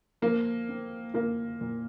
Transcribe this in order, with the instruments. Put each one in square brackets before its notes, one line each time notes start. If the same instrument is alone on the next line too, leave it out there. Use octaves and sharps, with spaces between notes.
[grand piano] F3 [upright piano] A#3
[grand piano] C4
[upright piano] A#3 [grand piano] F4
[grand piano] A#2